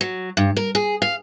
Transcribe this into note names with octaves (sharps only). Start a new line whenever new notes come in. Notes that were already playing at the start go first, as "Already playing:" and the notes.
F#3
G2
A#4
G#4
F5